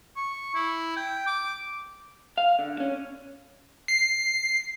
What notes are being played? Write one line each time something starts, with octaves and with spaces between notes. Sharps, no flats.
C#6
E4
G5
D6
F5
D3
C#4
C7